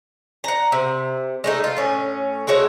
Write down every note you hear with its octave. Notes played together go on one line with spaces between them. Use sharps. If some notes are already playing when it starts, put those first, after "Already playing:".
F#5 A#5
C3
G#3 A3 D#4
F4
A2 C#4
G#3 A3 F#4 C#5